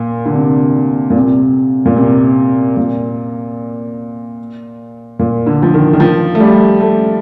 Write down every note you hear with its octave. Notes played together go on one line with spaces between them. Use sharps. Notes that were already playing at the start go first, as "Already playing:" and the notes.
Already playing: A#2
D3
C3
A#2
C3
A#2
C3
A#2
A#2
D3
F3
D#3
D#3
F3
A3
G3
A3